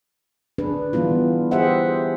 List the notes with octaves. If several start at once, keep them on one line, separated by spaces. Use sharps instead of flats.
D4 G#4 B4
E3 G3 B3 E4 F4
G4 G#4 C5 E5 F#5